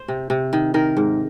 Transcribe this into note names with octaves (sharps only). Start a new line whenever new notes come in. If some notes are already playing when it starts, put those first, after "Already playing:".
Already playing: C5
C3
C3
D#3
D#3 A#4
G#2